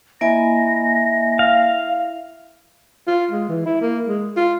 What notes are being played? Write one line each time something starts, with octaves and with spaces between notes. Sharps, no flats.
A#3 E4 D#5 G#5 A#6
F5
F4
G#3
E3
E4
A#3
G#3
F4